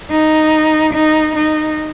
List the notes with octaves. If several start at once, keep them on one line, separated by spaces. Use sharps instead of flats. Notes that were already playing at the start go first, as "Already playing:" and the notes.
D#4
D#4
D#4